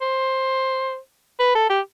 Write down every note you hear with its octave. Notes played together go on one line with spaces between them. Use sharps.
C5
B4
A4
G4